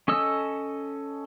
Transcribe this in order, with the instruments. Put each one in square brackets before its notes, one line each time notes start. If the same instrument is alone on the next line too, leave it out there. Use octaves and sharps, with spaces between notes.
[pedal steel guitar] C#4 A4 D#5 E6